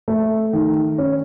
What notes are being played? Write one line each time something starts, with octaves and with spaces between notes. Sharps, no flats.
A3
D#3
C#4